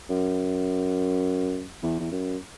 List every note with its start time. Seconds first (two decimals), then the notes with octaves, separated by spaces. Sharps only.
0.09 F#2
1.83 E2
2.00 E2
2.11 F#2